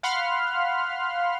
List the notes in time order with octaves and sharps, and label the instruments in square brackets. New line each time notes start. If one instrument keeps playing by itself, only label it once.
[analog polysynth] F5 F#5 B5 C6 F6